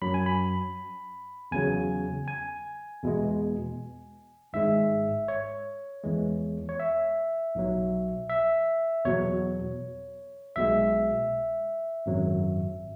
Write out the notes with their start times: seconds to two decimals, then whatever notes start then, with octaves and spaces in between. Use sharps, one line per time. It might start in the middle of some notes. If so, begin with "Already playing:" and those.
0.02 F#2 F#3 B5
0.14 G#5
0.26 B5
1.51 E2 C#3 F#3 G#5
2.28 G#5
3.03 E2 B2 G#3
4.53 G#1 G#2 G#3 E5
5.28 C#5
6.03 E2 E3 G#3
6.69 C#5
6.80 E5
7.55 B1 B2 F#3
8.30 E5
9.05 E2 B2 F#3 C#5
10.56 B1 B2 G#3 E5
12.06 G#1 F#2 F#3